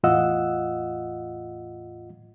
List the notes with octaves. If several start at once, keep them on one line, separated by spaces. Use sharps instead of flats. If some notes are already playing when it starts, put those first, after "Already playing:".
E2 A2 F4 D#5 F#5 E6